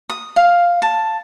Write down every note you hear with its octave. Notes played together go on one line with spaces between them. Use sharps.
D#6
F5
A5